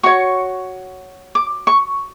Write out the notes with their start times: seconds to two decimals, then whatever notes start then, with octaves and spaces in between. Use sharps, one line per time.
0.03 F#4 C#5 C#6
1.35 D6
1.67 C#6